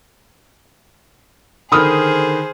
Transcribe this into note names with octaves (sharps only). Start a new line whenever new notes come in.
D3 D#3 G#4 C5 B5 D#6 F6